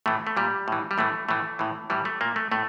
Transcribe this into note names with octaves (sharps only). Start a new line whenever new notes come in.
A2 E3 A3
A3
A#2 G3
A2 E3
G3
A2 E3 A3
A2 E3 A3
A2 E3
A2 E3 G3
A3
A#2 A#3
A3
A2 A3